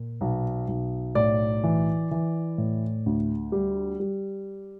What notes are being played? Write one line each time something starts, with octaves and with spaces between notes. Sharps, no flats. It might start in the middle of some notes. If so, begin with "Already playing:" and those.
Already playing: A#2
B1
B1
A2 D5
E3
E3
A2
D2
G3
G3